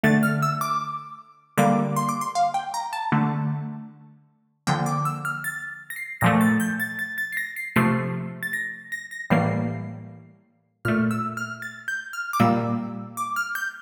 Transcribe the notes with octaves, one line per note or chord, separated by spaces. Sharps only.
D3 A3 A6
F6
E6
D6
D3 G3 A#3 D6
C6
D6
C6
F5
G5
A#5
A5
D3 A3
D3 F3 A#3 G5
D6
E6
F6
A6
A#6
C7
A#2 F3 A3 A#6
A6
G6
A6
A6
A6
C7
A#6
C7
C3 F3 A3 C7
A6
A#6
A#6
A#6
A2 E3 G3 A#3 C7
A#2 A3 F6
E6
F6
A6
G6
F6
D6
A#2 G3 A#3 E6
D6
F6
G6